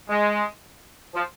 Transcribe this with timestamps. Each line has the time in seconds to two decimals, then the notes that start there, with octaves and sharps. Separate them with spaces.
0.09 G#3
1.14 F3